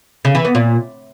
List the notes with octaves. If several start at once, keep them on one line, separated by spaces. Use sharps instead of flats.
C#3
E3
B3
A#2